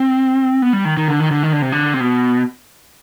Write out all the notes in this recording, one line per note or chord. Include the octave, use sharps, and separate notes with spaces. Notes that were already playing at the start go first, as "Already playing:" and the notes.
Already playing: C4
B3
G3
D#3
D#3
D3
D#3
D3
D#3
D3
C3
D3
C3
B2